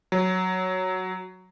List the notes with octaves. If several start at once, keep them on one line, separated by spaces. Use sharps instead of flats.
F#3